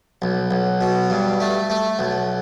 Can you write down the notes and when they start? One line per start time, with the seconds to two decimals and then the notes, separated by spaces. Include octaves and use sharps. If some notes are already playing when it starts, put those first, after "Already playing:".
0.22 B1
0.51 B1
0.81 B2
1.10 G2
1.40 A3
1.70 A3
1.99 B1